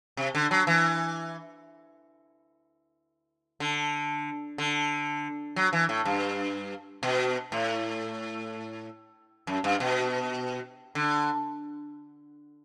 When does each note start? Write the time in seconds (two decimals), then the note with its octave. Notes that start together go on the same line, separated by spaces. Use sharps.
0.17 C3
0.35 D3
0.51 F#3
0.67 E3
3.60 D3
4.58 D3
5.56 F#3
5.73 E3
5.89 A2
6.05 G2
7.03 B2
7.52 A2
9.47 F#2
9.64 G2
9.80 B2
10.95 D3